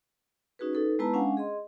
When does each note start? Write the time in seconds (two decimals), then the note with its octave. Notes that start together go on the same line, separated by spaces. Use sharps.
0.59 C#4 D#4 F#4 G#4 B4
0.73 D#4 A4 B4
0.99 G#3 B3 E4 B4 A5 A#5
1.14 G#3 C#4 D4 F5 F#5 G#5
1.37 G#4 D#5 C6